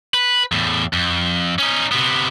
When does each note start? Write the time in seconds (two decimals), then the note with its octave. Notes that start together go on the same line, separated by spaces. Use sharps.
0.14 B4
0.52 E2 A2
0.93 F2
1.59 C#4 D#4
1.92 C3 B3